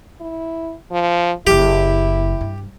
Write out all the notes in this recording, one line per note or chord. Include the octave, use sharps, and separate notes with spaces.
E4
F3
F#1 F#3 E4 G4
G2